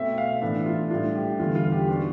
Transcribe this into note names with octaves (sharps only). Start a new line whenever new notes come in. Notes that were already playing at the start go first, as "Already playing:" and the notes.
Already playing: B2 A3 C4 E5
F5
A2 E3 B3 D4 E5
F4
A2 G3 D4 F4
G4
E2 D3 G3 B3 F4
F4
G4
B2 B3 D4 F4